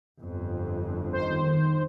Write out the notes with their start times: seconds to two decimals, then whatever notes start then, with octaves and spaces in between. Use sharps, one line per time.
0.20 G1 F2
1.13 D#3 C5